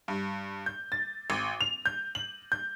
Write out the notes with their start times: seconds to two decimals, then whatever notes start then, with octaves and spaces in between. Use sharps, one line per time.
0.08 G2
0.66 G6
0.92 A6
1.30 G#1
1.61 F7
1.86 G6
2.15 F#7
2.52 G6